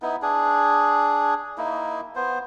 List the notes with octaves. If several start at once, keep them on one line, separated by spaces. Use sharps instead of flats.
B3 D#4 E4
D4 G#4
A#3 D#4 E4
B3 C5